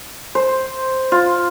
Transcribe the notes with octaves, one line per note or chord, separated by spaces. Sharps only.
C5
F4